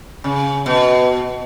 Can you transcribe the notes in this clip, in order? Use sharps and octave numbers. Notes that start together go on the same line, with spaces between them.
C#3
B2